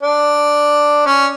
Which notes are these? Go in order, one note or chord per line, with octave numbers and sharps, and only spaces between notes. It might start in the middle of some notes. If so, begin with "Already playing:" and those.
D4
C#4